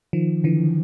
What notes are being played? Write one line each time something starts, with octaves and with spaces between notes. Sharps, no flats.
D#3 F3
D3 E3